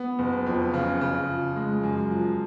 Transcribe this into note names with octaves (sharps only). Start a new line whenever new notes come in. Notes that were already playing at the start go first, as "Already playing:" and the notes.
Already playing: B3
F#1
F2
C#3
C#3
F3
G#3
F#2
F3